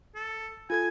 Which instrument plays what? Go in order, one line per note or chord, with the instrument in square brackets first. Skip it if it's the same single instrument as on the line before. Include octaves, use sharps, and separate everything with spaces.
[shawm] A4
[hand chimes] F4 A4 G#6 [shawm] G#5